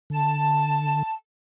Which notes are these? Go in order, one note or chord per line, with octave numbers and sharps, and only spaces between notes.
D3 A5